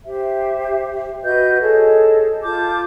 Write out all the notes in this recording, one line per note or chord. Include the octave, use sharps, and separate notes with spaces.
G4 C5 E5
F#4 B4 D#5 G6
G#4 A4 C#5 D#5
F4 A5 D6 G6